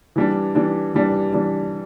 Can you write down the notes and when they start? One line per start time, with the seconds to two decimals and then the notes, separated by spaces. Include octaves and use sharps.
0.16 E3 G3 D4
0.55 E3 G3 D4
0.94 E3 G3 D4
1.33 E3 G3 D4